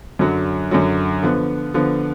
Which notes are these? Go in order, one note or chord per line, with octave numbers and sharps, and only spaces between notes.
F#2 D3 F#3
F#2 D3 F#3
D3 F3 B3
D3 F3 B3